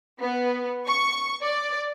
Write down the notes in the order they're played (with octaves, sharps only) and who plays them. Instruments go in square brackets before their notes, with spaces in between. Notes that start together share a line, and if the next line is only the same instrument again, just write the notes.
[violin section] B3
C#6
D5